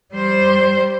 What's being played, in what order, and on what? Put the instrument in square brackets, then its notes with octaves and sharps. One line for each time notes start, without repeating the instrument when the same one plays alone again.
[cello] G3 C5